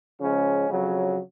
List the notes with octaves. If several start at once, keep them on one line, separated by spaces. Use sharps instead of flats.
C#3 F3 G#3 C#4
F2 C#3 F#3